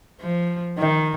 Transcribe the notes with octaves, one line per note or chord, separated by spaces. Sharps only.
F3
D#3